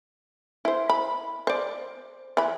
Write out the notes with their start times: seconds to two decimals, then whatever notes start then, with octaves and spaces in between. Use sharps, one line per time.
0.65 E4 C5
0.90 B5
1.47 C5 D5
2.37 E3 B5